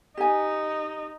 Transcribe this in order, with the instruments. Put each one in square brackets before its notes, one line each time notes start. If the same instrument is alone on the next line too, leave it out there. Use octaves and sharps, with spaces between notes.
[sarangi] D#4 [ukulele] G4 G#5